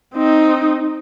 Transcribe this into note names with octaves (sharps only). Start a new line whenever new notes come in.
C4 D#4